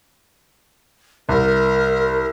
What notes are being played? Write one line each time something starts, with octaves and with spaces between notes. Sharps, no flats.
C2 A#4